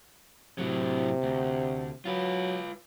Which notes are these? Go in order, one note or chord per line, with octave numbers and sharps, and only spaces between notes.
A2 C3 F#3
D2
F#3 F4 B4